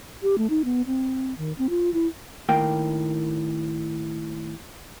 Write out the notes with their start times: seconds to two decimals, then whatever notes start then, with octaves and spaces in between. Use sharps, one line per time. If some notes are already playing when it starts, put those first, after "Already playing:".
0.23 G4
0.38 A3
0.50 D#4
0.65 B3
0.87 C4
1.38 D#3
1.58 C4
1.70 F4
1.94 E4
2.49 A2 D#3 A#3 G5